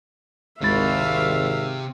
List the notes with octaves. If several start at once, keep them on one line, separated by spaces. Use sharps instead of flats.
G#1 C#2 C3 G#3 E5 F5 B5 A6